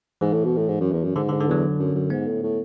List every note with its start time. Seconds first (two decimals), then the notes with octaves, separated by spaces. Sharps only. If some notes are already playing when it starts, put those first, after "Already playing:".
0.21 G#2 E3
0.32 A2
0.45 B2
0.56 A2
0.69 G#2
0.81 F#2
0.92 E2
1.04 F#2
1.16 G#2 D3
1.29 D3
1.32 G#2
1.40 D3
1.48 E2 F#3
1.79 F#2
1.94 F#2
2.10 G#2 B3
2.27 A2
2.43 A2